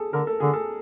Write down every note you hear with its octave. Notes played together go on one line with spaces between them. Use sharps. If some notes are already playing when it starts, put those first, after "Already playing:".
Already playing: G#4 A4
D3 A#4
A4
D3 G#4
A4